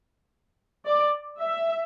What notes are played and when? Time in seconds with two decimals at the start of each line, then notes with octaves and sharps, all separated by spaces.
0.86 D5
1.40 E5